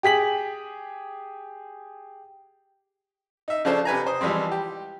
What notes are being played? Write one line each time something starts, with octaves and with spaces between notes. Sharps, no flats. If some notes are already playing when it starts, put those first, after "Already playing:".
G4 G#4 B6 F#7
D#4 E5
C#3 F3 D4 A4 C5
C3 B4 G#5 A#5
C5 D#6
E3 F3 G3 G#3 C4
G4